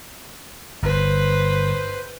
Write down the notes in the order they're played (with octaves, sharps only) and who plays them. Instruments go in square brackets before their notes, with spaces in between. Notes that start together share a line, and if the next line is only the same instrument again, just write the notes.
[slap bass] G1 [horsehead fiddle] B4 C5